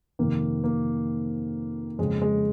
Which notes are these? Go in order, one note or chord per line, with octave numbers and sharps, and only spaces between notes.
F2 C3 D#3 A#3
A#3
F2 C#3 G#3
G#3